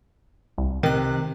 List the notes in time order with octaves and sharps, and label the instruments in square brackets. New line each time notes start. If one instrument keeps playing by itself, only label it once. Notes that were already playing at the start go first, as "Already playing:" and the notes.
[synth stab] C2
[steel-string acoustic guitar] C3 [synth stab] D#3 F#6